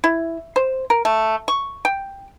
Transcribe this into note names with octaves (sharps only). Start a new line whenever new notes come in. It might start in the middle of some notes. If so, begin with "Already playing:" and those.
E4
C5
A#4
A3
C#6
G5